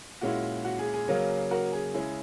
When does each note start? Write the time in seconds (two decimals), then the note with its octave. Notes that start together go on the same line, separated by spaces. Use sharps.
0.21 A#2 G#3 C#4 E4 F#4
0.65 F#4
0.79 G#4
0.94 G#4
1.08 C#3 F#3 A#3 C#4
1.51 F#4 A#4
1.72 G#4
1.94 C#3 G#3 C#4 E4 G#4